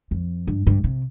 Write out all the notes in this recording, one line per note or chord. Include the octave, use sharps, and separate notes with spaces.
F2
G2
G2
C3